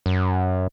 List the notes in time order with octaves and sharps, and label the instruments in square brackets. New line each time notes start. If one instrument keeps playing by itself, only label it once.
[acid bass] F#2